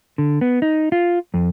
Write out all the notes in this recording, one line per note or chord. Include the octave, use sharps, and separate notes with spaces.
D3
B3
D#4
F4
F2